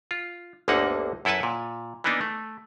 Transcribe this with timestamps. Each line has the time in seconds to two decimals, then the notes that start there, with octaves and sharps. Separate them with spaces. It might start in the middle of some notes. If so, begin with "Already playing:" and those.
0.11 F4
0.68 G1 D2 D3 A#3 D#4 F#5
1.25 F#2 E4 A4 B4 G#5 A5
1.43 A#2
2.04 E3 A#3 B3 D4 D#4
2.21 A3